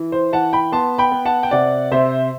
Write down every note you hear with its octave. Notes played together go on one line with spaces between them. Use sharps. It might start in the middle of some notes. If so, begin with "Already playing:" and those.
Already playing: E3
C5
E3 F#5 A5
G5 B5
B3 A5 C6
G5 B5
B3
F#5 A5
G5
C3 D5 F#5
C3 C5 E5